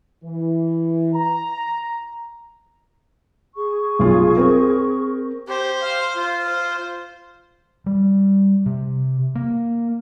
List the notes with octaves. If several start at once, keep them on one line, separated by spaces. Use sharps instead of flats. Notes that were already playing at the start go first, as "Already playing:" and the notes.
E3
A#5
G#4 C#6
B1 F4
C4 A#4
G4 C5
F5
F4
C5
G3
C3
A#3